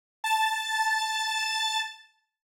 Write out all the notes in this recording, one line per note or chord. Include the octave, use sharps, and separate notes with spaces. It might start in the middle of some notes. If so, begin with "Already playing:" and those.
A5 A6